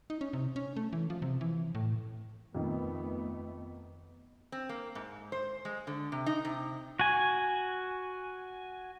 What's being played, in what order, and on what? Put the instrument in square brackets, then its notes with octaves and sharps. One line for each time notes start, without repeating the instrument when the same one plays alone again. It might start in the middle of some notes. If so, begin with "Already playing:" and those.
[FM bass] D#4
C#4
C3
C#4
A3
E3
F3
C3
E3
A2
[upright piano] F2 D#3 [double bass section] A3 B3
[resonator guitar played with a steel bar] C4
A#3
G#2
C5
G#3
D3
C3
D#4
C3
[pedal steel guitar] F#4 G#5